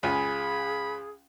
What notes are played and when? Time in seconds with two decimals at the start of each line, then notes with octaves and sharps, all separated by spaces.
0.03 C#2 F4 G#4 G#5 B5